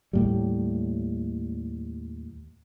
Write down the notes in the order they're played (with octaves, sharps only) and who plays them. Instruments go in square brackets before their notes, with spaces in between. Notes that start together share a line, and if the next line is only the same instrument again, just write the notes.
[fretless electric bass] D#2 A2 G3